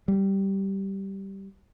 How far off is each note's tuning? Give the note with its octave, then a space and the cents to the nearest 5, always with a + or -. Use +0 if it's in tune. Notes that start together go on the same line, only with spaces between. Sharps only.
G3 -10